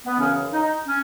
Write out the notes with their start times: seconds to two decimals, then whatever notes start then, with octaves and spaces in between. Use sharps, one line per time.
0.05 B3
0.18 F#2 C#3 E3 C#4
0.53 D#4
0.88 C#4